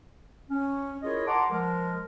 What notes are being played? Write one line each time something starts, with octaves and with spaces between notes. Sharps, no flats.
C#4
E4 F4 G#4 A#4 C#5 D#5
F#5 A5 A#5 C6 D6
F3 G#3 A#4